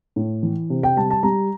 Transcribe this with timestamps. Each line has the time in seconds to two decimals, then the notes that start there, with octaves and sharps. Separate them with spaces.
0.16 A2
0.43 E3
0.70 C3
0.83 G5
0.97 G3 A5
1.10 A5
1.23 G3 A#5